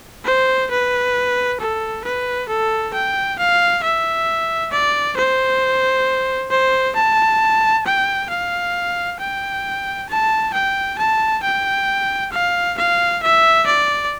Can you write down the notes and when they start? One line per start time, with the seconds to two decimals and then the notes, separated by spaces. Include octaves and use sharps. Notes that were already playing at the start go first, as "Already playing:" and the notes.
0.25 C5
0.70 B4
1.60 A4
2.04 B4
2.49 A4
2.93 G5
3.39 F5
3.83 E5
4.72 D5
5.16 C5
6.51 C5
6.96 A5
7.86 G5
8.29 F5
9.20 G5
10.09 A5
10.54 G5
10.98 A5
11.43 G5
12.32 F5
12.77 F5
13.23 E5
13.66 D5